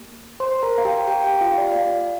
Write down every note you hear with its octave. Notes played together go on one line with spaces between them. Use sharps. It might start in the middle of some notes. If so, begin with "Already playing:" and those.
Already playing: A#3 G4
C5 C6
A#4 A#5
F5
G4 G5
A#5
G4 G5
G4 G5
F4 F5
F5
D5
F5
A#3 F4 D5